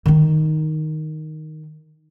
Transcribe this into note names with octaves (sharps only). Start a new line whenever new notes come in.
D#3 D#4